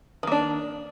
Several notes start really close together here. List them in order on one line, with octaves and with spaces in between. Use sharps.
D#3 A#3 D4